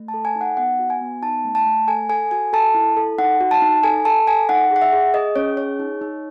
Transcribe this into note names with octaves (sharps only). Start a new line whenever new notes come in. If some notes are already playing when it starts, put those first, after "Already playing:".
Already playing: A3
A5
A4
G#5
D#4
F#5
B3 F#5
F#4
G#5
B3
D#4 A5
A3
A5
A3
A4 G#5
A4 G#5
F#4 G#5
A4 A5
E4
A4
D#4 F#5
F#4
A5
D#4
A4 G#5
A4 A5
A4 G#5
D#4 F#5
G#4
F#5
E5
G#4
G#4 D#5
C#4 C#5
G#4 C#5
D#4
D#4